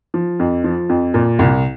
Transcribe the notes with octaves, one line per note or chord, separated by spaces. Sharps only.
F3
F2
F3
F2
A#2
C2